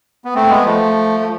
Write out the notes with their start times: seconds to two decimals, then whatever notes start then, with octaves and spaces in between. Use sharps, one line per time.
0.25 B3
0.35 A3 C4
0.49 G#3 B3
0.65 F3 A3
1.20 A3